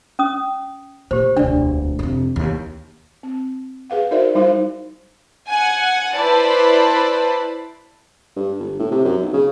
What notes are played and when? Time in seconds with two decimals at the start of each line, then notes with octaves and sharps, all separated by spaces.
0.19 C#4 D#6
1.11 A#2 G4 C5
1.37 E1 D2 D4 D5
1.99 F2 C3
2.36 D#2
3.23 C4
3.90 G#4 B4 F5 F#5
4.11 D#4 F#4 A#4 C5 D5 E5
4.35 G3 D#4 E4 C5 F5
5.49 F#5 G#5
6.15 E4 B4 C5 D5 A5 B5
8.36 G2
8.59 G1
8.80 A2
8.91 C3
9.05 F#2
9.22 B1
9.33 C#3